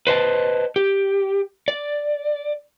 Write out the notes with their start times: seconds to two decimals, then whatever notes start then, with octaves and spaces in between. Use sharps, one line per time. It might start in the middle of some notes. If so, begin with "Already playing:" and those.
0.07 B4 C5 D#5 A5
0.76 G4
1.68 D5